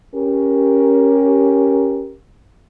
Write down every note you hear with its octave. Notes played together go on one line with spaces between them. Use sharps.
C#4 G4 A#4